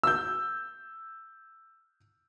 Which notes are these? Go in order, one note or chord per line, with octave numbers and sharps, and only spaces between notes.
E6 G6